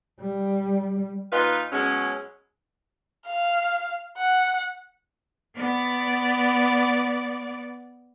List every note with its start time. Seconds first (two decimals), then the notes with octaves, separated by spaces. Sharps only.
0.20 G3
1.31 A#2 D#4 F4 B4
1.71 B2 F#3 G#3 C#4
3.27 F5
4.18 F#5
5.56 B3 D5